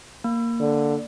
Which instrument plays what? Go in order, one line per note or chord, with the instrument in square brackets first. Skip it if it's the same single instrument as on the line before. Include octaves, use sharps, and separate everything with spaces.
[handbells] A#3
[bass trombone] D3